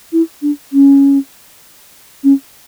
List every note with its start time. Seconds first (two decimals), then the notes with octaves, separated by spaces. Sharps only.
0.13 E4
0.42 D4
0.73 C#4
2.24 C#4